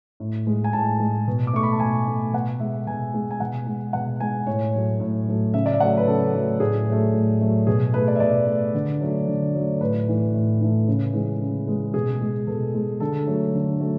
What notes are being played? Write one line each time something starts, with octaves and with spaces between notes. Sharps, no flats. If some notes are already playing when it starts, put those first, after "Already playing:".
A2
G#3
G#5
A2 A5
G#3
B2
D6
A3 C#6
B5
A5
B2 G#5
A3
B2 F#5
G#3 E5
B2 G#5
G#3
G#5
B2 F#5
G#3
B2 F#5
G#3 G#5
A2 C#5
F#3 A3
A2
F#3 A3
C#3 E5
D5
E5
F#3 A3 F#5
B4
C#3 A4
F#3 A3
A2 G#4
F#3 A3
A2
F#3 A3
B2 G#4
A3 B4
D5
E5
B2 D5
A3
D3
F#3 A3
D3
F#3 A3
A2 B4
E3 A3
A2
E3 A3
C#3
E3 G#3
C#3
E3 G#3
B2 G#4
G#3
B2 A4
G#3
D3 A4
F#3 A3
D3
F#3 A3